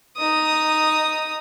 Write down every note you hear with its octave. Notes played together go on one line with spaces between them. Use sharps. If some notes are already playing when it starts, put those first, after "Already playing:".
D#4 D#6